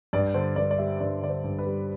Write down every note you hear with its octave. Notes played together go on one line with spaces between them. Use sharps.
G2 D5
D3 C5
G2 D5
D5
G3 E5
G2 D5
D3 D5
C5
G2
B4
G3